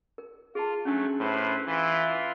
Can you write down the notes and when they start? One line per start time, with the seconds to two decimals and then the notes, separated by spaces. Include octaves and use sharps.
0.18 A#4
0.55 F4 G#4 A5
0.85 F#3 A3 C#4 D4 G#5
1.20 A2 B4 C5
1.67 E3 E4 F4 C6